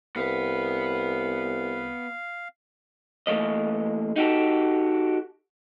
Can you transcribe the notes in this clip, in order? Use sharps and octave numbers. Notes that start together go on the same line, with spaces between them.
C2 B3 B4 F5
E3 A3 A#3 D#5
D#4 F#4 G4 A4